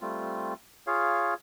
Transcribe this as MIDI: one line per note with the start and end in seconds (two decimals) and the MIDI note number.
0.01 0.54 55
0.01 0.54 57
0.01 0.54 60
0.01 0.54 65
0.87 1.34 65
0.87 1.34 68
0.87 1.34 73
0.87 1.34 77